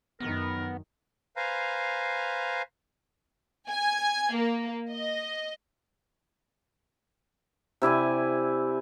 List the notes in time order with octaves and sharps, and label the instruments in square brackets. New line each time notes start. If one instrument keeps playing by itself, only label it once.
[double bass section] F#2 D#3 [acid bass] B3 [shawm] A#4
[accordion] B4 C5 F5 G#5 A#5
[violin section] G#5
A#3
D#5
[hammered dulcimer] C3 E4 D5 G#5